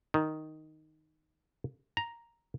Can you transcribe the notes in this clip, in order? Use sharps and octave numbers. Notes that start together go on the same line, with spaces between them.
D#3
A#5